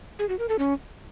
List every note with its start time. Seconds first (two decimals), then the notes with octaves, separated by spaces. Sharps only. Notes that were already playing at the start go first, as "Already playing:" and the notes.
0.19 G#4
0.29 F#4
0.39 A#4
0.49 A4
0.59 C#4